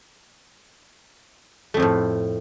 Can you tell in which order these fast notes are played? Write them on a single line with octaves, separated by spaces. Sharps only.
A3 F2 F3 A2